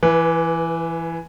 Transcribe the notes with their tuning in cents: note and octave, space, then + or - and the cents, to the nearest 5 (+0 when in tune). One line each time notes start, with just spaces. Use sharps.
E3 +15 B4 -15